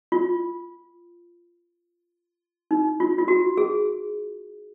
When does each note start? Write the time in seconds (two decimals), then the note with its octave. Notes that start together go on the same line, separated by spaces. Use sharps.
0.12 F4
2.71 D#4
3.00 F4
3.18 F4
3.28 F#4
3.57 G#4